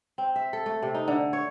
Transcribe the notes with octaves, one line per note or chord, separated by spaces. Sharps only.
C4
E5
A4
A3
C3
D#4
D3
C#5